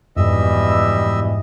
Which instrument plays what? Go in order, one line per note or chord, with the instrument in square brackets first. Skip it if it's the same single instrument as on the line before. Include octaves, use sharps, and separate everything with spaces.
[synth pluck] F2 [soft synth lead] G#2 [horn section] B2 E3 G3 [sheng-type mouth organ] D#5 E5 E6